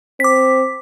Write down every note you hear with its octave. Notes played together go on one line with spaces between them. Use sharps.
C4 D6 B6